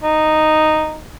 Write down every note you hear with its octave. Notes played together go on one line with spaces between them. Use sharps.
D#4